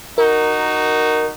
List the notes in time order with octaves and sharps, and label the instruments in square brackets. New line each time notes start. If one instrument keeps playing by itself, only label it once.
[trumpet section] D#4 F#4 [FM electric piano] A#4